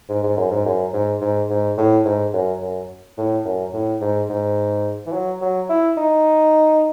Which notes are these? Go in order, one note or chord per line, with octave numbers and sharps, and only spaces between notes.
G#2
G#2
F#2
G#2
F#2
G#2
G#2
G#2
A2
G#2
F#2
F#2
A2
F#2
A2
G#2
G#2
E3
F#3
F#3
E4
D#4